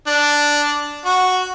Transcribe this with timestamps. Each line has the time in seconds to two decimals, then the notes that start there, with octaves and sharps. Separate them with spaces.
0.07 D4
1.05 F#4